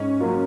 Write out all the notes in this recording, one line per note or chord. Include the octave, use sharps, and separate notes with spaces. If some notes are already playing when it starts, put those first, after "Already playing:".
Already playing: G#2 C#4
F#3 A#3 F4